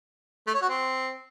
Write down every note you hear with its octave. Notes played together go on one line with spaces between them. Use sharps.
A3
C#5
F#4
C4